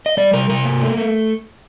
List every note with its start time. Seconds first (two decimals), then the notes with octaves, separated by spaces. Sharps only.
0.06 D#5
0.17 G3 D5
0.33 C3 A#4
0.49 C3 A#4
0.65 A#3
0.81 A3
0.97 A3